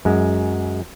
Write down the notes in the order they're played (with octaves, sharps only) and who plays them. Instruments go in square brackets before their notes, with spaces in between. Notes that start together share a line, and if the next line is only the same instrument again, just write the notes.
[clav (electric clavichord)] F#2 G#3